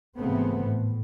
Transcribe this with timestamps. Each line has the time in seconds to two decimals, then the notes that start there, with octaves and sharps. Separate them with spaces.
0.17 G#1 C#3 E3 A3 B3 C4
0.64 A2